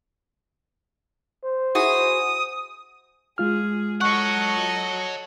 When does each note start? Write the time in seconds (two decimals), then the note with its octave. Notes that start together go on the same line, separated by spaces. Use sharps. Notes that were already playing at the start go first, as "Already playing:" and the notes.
1.44 C5
1.75 E4 F#4 G#4 D#6
3.38 G#3 F4 G#4 F6
4.01 A4 C#5 D#5 F#5 C#6 F#6